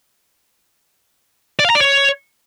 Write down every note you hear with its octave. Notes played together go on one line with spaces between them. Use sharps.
D5
F5
A#5
D5
C#5